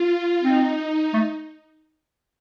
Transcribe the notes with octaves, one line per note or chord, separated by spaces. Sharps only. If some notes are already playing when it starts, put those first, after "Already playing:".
Already playing: F4
C4 D#4
A3